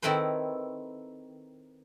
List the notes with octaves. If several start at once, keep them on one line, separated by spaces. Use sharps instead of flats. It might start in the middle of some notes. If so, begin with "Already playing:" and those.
D#3 C4 E4 A4 B4 C5